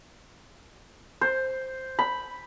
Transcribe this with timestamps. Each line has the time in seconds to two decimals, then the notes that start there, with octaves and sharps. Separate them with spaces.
1.21 C5
1.99 B5